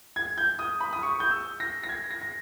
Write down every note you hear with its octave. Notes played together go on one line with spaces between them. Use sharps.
G#6
G6
D#6
B5
D#6
C#6
G6
E6
A#6
A#6
G#6
A#6
A#6